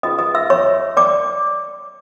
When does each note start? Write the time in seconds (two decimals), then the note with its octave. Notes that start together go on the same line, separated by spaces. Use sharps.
0.03 C#4 F4 G#4 B4 D#5 D#6
0.19 D#5 D#6
0.35 E5 E6
0.50 C#5 C#6
0.97 D5 D6